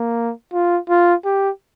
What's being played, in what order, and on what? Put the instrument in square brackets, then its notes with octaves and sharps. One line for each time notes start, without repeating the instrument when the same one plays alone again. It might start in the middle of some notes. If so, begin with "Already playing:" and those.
Already playing: [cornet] A#3
F4
F4
G4